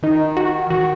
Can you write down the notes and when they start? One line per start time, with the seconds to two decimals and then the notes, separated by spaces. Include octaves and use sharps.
0.03 D#3 D#4
0.37 F#4
0.70 D#3 F#4